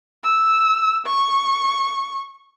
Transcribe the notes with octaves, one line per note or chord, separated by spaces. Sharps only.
E6
C#6